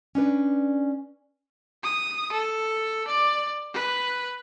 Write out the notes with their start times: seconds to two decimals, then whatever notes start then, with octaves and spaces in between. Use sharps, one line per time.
0.15 C#4 D4 B4 D5
1.84 D#6
2.33 A4
3.08 D5
3.74 B4